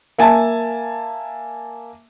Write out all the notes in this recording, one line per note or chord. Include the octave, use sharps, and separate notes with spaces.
A#3 E5 G#5 A5